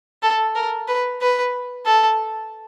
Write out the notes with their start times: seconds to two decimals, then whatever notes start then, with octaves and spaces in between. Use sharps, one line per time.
0.23 A4
0.55 A#4
0.88 B4
1.21 B4
1.86 A4